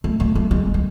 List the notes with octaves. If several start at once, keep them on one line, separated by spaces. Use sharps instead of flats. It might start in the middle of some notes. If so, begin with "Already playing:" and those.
A3
A3
A3
G#3
G#3